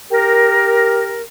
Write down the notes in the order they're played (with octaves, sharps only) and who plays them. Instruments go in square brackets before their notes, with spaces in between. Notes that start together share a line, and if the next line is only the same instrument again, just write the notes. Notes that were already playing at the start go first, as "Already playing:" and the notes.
[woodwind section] G4 A#4